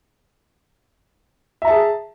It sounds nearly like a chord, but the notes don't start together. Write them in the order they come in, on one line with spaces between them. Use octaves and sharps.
E5 A#5 A5 G#4